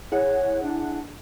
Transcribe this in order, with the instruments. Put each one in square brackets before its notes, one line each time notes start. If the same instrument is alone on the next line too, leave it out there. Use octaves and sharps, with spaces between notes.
[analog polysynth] E4 G#4 F#5 [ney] C#5
[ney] D4